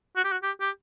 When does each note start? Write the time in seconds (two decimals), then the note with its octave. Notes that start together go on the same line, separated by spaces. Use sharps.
0.16 F#4
0.24 G4
0.32 F#4
0.43 G4
0.61 G4